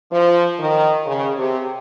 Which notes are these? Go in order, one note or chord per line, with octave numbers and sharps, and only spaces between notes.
F3
D#3
C#3
C3